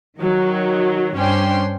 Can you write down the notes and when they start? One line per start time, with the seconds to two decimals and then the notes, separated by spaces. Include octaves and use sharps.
0.18 D#3 F#3
1.15 G2 C#4 D4 C5 G5 C6